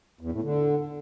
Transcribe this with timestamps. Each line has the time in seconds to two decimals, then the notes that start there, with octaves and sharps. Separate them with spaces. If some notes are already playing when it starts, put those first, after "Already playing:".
0.21 E2
0.32 A2
0.43 D3